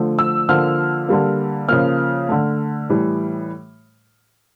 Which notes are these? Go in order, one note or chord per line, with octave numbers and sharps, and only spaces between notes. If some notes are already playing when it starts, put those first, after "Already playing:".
Already playing: D3 F3 A3
E6
D3 F3 A#3 F6
D3 G3 A#3
C#3 F3 A#3 F6
D3 A3
A2 E3 G3